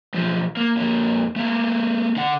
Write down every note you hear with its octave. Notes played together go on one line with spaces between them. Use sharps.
B1 F3
A#3
F2 A#3
A3 A#3
D3 F#5